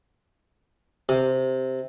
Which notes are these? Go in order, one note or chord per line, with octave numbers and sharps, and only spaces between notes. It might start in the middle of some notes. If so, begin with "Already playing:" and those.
C3